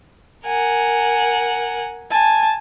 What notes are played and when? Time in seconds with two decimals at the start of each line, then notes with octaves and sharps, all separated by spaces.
0.46 A#4 F#5 G#5
2.11 G#5 A5